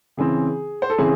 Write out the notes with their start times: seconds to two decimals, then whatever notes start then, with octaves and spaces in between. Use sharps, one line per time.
0.17 C#3 E3 C4 G#4
0.82 C5
0.90 A4
0.98 C#3 E3 C4 G#4